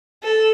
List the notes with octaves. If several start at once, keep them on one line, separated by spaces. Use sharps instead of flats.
A4